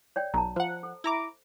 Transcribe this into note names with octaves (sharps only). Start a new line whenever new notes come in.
C#5 D5 G5
B1 A5 A#5
F3 C5 F#5
A4
E4 A#5 D6